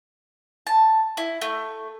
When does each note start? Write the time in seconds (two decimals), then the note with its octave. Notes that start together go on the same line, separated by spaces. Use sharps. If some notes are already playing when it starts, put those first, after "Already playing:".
0.67 A5
1.17 E4
1.41 A3